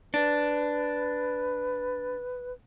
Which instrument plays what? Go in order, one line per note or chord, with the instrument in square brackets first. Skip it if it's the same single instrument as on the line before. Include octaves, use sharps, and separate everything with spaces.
[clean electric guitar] D4 [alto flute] B4